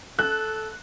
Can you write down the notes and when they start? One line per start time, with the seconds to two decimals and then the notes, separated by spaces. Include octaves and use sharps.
0.19 A4 F#6